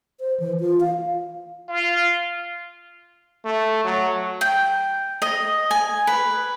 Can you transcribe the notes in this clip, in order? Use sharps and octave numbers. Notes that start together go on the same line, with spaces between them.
C5
E3
F4
F5
F4
A3
F#3
G5
D#5
G#5
B4